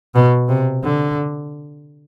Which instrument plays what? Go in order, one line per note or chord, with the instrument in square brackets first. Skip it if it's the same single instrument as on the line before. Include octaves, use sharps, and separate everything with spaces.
[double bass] B2
C3
D3